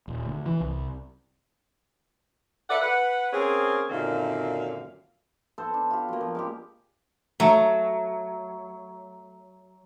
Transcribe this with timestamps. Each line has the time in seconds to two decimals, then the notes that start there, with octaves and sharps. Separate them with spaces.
0.08 D#1
0.26 D2
0.46 E3
0.60 C2
2.70 A4 B4 D5 E5 F#5
2.82 B4 F#5
3.32 A#3 C4 C#4 G#4
3.90 F#2 A#2 D3 D#3 C4 F5
5.58 B3 A4 C5
5.74 D4
5.90 F4 G4
6.09 F#3 A#3
6.21 F3
6.35 G#3 C#4 G4
7.40 F#3 A3